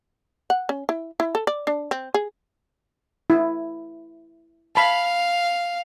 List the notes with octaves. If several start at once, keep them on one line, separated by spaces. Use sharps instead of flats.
F#5
C#4
E4
E4
A4
D5
D4
C4
G#4
E4
F5 A5 B5